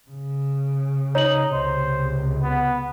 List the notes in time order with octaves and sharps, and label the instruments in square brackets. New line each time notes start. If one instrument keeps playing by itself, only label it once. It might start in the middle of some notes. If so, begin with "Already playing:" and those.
[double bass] C#3
[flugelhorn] D#4 [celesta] C#5 F#7
[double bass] C#2 C3 [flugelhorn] C5
[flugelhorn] B3